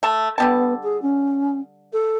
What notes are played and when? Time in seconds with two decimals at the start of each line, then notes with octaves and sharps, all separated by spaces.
0.03 A3 A5
0.38 D3 G3 B3 A5
0.82 G#4
1.01 C#4
1.92 A4